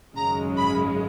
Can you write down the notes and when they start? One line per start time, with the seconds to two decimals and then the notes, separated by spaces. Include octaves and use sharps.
0.15 G#1 F#2 C#3 G#3 C#4 A#5
0.57 B5